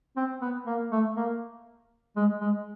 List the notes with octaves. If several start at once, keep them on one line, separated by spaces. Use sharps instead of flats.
C4
B3
A#3
A3
A#3
G#3
G#3